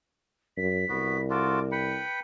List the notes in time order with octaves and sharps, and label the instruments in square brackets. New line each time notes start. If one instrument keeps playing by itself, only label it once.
[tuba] F#2 [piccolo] B6
[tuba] C2 [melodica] B3 F#4
[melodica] F4 F#4 A4 [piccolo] D6
[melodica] B4 G5 B5 [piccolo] C#7